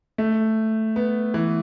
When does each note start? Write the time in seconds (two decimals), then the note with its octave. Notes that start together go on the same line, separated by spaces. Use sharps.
0.18 A3
0.96 B3
1.34 E3